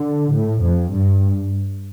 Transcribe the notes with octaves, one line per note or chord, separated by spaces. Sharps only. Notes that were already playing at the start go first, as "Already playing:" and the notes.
Already playing: D3
A2
F2
G2